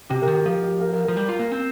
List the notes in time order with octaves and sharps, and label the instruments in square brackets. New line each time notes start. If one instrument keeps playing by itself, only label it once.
[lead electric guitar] C3 [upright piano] G4
[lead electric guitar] C3 [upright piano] A#4
[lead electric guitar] D#3
[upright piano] G4
[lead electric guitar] F3 [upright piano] A#4
[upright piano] G4
A#4
A#4
[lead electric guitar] F3 [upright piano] A#4
[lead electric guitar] G3
F4
A#3
C4